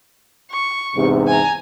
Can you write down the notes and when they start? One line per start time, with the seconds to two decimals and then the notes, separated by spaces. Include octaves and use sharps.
0.51 C#6
0.95 E2 G#2 C3
1.27 G#5 A#5